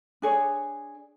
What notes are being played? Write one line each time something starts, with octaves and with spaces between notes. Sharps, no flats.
D4 G#4 C#5